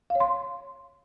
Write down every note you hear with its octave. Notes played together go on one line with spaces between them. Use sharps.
F5
C#5
C6